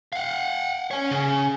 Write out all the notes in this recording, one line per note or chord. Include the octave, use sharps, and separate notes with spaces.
F5 F#5
C#5 G#5
C#3